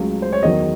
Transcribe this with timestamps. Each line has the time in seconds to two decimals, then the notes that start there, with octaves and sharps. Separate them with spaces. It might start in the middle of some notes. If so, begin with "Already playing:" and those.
Already playing: C#2 C#3 F#3 A3
0.22 C5
0.33 C#5
0.43 E2 D#3 F#3 D#5